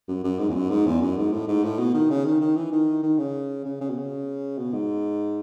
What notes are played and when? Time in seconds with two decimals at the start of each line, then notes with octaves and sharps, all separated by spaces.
0.08 F#2
0.24 F#2
0.39 G#2
0.49 E2
0.55 F#2
0.70 G#2
0.86 E2
1.01 F#2
1.17 G#2
1.32 A2
1.48 G#2
1.64 A2
1.79 B2
1.94 D#3
2.10 C#3
2.25 D#3
2.41 D#3
2.56 E3
2.72 D#3
3.03 D#3
3.18 C#3
3.65 C#3
3.81 C#3
3.90 B2
3.98 C#3
4.58 B2
4.74 G#2